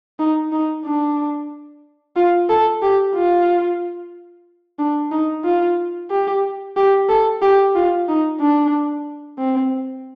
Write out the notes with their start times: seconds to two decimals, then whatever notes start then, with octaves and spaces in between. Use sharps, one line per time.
0.19 D#4
0.52 D#4
0.85 D4
2.16 F4
2.49 A4
2.82 G4
3.15 F4
4.79 D4
5.11 D#4
5.44 F4
6.10 G4
6.77 G4
7.09 A4
7.42 G4
7.75 F4
8.08 D#4
8.40 D4
9.38 C4